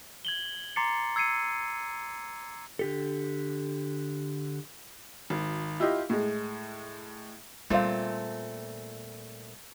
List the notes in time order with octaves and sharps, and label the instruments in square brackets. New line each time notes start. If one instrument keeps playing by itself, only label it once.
[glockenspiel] G#6 F#7 G7
A#5 C6 D6 A6 C7 C#7
E6 G#6 C7 C#7 D#7
[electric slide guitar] D3 G4 A4
[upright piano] G#1
E4 F4 G4 D#5
A2 G#3
[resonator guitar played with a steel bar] A#2 A3 C4 [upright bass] G3 B3 [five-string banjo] F4 C5 F5